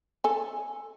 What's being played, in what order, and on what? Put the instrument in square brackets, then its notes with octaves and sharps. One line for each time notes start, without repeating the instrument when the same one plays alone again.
[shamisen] A4 G#5